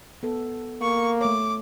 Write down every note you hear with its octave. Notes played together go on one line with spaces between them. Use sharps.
B3 A4
A#3 C#6
A3 C#5 D6